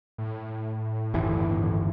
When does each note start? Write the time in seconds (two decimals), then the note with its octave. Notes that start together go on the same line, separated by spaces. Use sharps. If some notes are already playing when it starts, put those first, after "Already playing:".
0.18 A2
1.14 G1 D#2 E3